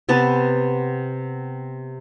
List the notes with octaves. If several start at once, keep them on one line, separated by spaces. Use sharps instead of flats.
C3 B3 A5